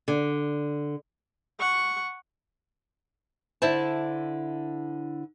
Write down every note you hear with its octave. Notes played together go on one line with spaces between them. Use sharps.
D3
F#5 C#6
D3 E4 C5 D5 E5 A5